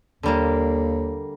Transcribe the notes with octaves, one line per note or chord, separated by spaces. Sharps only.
D#2 D3 G3 A#3